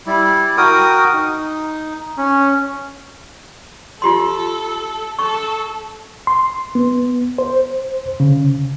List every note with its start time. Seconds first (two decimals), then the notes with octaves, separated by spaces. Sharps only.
0.07 G3 E4
0.57 F#4 A#4 G5 D#6
1.14 D#4
2.18 C#4
4.02 F4 G4 A4 C6
5.19 A4 C#6
6.27 C6
6.75 B3
7.38 C5
8.20 C#3